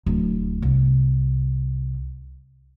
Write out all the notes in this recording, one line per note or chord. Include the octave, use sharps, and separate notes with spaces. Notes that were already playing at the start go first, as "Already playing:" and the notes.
D1
C2